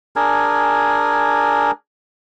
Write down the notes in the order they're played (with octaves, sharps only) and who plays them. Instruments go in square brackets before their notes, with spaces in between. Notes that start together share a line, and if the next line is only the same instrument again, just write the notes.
[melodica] D4 G#4 A#4 G#5